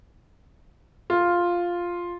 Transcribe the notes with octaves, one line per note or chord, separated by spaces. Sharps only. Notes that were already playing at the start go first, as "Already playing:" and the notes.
F4